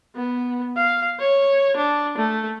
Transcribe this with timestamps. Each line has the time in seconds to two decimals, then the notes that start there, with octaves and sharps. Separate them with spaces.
0.15 B3
0.76 F5
1.20 C#5
1.77 D4
2.17 A3